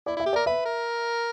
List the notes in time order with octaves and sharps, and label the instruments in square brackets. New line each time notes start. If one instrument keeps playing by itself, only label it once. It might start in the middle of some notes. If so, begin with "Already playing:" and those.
[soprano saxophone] E4 [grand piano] D5
[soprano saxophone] E4 [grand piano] E5
[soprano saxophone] G4
[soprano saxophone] A#4 [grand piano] D5
[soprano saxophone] B4 [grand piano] E5
[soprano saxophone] A#4